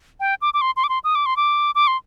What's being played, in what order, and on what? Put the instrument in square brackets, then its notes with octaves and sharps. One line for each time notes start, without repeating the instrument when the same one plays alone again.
[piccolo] G5
D6
D6
C6
C6
D6
C6
D#6
D6
C6
D6
D6
C6